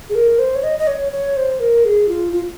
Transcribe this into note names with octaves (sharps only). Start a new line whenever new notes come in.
G#4
A#4
C5
C#5
D#5
D#5
C#5
C#5
C5
A#4
G#4
F4
F4